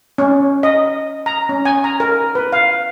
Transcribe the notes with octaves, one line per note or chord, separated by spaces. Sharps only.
C#4
D#5
A#5
C#4
G#5
A#5
A#4
B4
F5